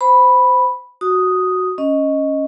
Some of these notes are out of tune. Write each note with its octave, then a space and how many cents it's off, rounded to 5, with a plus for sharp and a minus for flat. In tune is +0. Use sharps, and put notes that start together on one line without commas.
C5 -15 B5 +0
F#4 +0 D#6 +0
C#4 +0 D#5 +0